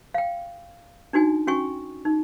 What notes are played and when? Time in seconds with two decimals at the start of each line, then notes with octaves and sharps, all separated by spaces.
0.14 F5 G5
1.13 D4 D#4 F#4 G#5
1.47 C#4 F#4 G5 G#5 C#6
2.05 D#4